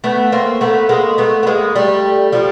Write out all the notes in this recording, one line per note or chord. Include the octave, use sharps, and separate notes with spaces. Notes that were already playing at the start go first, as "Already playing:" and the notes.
A3 B3
A#3 C4
A3 B3
G#3 A#3
A3 B3
B3
G#3 A#3
G3 A3
F3 G3